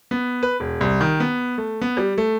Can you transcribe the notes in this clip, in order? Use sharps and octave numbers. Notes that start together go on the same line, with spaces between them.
B3
B4
E1
C2
D#3
B3
A3
B3
G3
A3